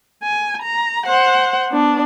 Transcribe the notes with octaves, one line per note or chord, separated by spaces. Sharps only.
G#5
A#5
C5 F#5
B3 D4